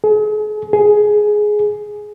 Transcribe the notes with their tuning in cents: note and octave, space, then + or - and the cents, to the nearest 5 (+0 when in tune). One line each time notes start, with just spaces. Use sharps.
G#4 +40
G#4 +10